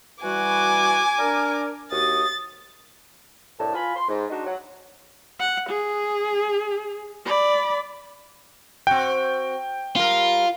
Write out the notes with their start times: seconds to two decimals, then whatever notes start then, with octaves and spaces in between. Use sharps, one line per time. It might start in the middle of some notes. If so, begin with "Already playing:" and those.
0.24 E3 G3 F#4 G#5 D6
1.19 D4 A#4
1.92 D#2 F#4 D#6 A6
3.59 C2 A2 D4 A5
3.74 F4 G#5 B5
3.96 C6
4.09 G#2
4.30 D4 D#4 F#4
4.46 F#3 F#5
5.40 F#5
5.70 G#4
7.26 D5 B5
8.87 C4 F#4 G5
9.96 G3 F4 A#4